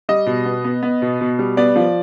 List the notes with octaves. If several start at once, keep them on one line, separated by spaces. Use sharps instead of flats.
G3 D#5
B2
B3
B3
B3
B2
B2
G3
B3 D5
F3